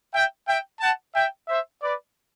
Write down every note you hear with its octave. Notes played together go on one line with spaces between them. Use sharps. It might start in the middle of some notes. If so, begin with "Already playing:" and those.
E5 G5
E5 G5
F#5 A5
E5 G5
C5 E5
B4 D5